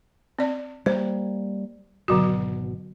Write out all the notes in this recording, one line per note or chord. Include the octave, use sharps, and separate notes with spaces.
C4 D5
G3 A#3 C5
G#1 B2 D3 F#3 F#4